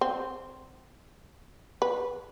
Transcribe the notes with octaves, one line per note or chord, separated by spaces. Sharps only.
C4
B4